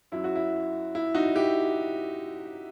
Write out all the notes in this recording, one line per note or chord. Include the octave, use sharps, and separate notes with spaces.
F#2 F#3 E4
F#4
E4
E4
D#4 F#4
E4 G4